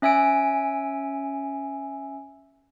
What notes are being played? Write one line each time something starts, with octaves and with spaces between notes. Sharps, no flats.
C#4 E5 G#5 E6 D7